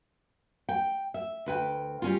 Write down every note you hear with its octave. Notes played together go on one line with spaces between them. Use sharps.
G5
E5
D2 B4 G5
G3 C#4 F4